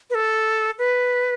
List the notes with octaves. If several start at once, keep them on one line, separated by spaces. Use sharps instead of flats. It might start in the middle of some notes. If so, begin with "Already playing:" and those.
B4
A4
B4